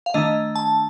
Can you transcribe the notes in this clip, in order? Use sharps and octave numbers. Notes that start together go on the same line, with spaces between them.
F5
D#3 A3 D4 D#5
A5